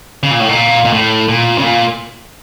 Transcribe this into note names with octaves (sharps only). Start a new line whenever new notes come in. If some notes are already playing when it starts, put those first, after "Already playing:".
C#3
A#2
A2
A#2
A#2
A2
A#2
C#3
A#2